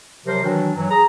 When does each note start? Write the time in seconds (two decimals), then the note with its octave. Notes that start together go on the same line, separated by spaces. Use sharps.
0.25 C3 F3 F#3 A#4 C5
0.43 D#3 E3 F#3 D4 F#4
0.76 G2 E3 F#3
0.90 G#4 A#5